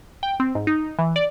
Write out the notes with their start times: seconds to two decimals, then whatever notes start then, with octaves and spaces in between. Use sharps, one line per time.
0.23 G5
0.40 C4
0.55 G#2
0.67 D#4
0.99 E3
1.16 D5